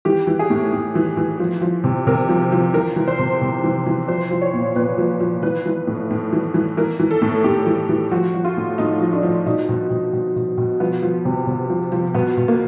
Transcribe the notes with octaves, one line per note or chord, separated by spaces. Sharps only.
E3 G4
E3
G#4
A2
A2
E3
E3
F3
F3
C3
C3 A#4
F3
F3
E3 A#4
E3
C5
C3
C3
E3
E3
F3 C5
F3
C#5
A#2
A#2 B4
F3
F3
E3 B4
E3
A2
A2
E3
E3
E3 A#4
E3
A4
A2
A2 G4
E3
E3
F3 F#4
F3
F4
A2
A2 D#4
F3
D4
F3
B2 D#4
B2
B2
B2
B2
B2
F3 B3
F3
C3
C3
F3
F3
B2 B3
B2
A#3